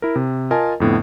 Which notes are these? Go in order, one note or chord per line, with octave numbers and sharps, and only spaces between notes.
E4 A#4
C3
F4 A#4 D#5 G#5 A5
F2 A2 D3 B3